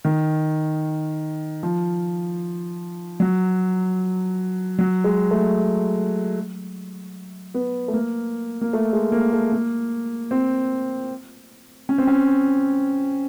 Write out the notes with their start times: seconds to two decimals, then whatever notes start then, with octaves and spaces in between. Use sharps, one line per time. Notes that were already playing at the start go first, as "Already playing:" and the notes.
0.05 D#3
1.63 F3
3.20 F#3
4.78 F#3
5.04 G#3
5.31 A3
7.54 B3
7.88 A3
7.94 A#3
8.61 A#3
8.73 A3
8.93 G#3
9.12 A#3
9.33 A3
9.53 A#3
10.31 C4
11.89 C#4
11.98 C4
12.07 C#4